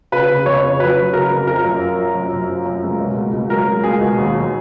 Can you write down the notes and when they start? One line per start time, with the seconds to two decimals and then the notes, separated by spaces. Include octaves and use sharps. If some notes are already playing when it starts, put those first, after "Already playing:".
0.12 C#3 B4
0.29 C#3
0.46 F2 C#5
0.63 C#3
0.80 F#3 B4
0.97 F#3
1.13 C#3 A#4
1.31 F2
1.47 F3 A#4
1.64 F#2
1.81 F3
1.98 F3
2.15 F#2
2.32 F#2
2.49 F3
2.66 F#2
2.83 C#2
3.00 B2
3.17 C#2
3.33 C#2
3.50 F#3 A#4
3.67 C#2
3.84 C#2 G#4
4.01 B2
4.18 D#2
4.35 F#3